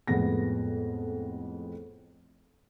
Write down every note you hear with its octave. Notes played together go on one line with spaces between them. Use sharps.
F2 A2 G#3 B3 A#6